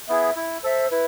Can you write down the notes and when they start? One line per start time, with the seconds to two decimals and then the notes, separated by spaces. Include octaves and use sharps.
0.08 B3 E4 G#4 E5
0.36 E4
0.63 A4 C5 E5
0.91 E4 B4